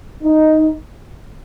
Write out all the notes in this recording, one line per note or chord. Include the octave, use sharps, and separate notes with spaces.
D#4